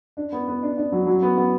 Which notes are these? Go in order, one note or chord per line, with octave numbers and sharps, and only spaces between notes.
D4
B3
B3
D4
D4
F#3
F#3
B3
B3